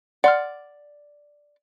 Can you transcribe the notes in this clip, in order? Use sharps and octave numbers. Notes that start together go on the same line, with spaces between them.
D5 F#5 C6 F6